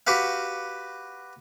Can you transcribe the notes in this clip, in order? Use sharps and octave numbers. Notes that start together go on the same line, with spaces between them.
F#4 G4 B4 F5